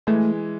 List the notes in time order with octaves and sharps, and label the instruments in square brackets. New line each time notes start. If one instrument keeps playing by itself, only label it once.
[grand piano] E3 G#3 [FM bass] A3